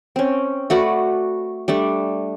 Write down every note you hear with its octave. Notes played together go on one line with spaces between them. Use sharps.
C4 C#4
A3 F#4 B4 D5
G3 A3 D4